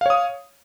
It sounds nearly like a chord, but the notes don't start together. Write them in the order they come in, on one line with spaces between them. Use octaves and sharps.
F5 C#5 D#6